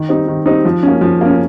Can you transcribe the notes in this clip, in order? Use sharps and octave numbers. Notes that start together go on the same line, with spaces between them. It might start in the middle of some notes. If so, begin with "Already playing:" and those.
Already playing: D#3
G3 C4 D#4
D#3
G3 C4 D#4
F3
A#3 C#4
F3
A#3 C#4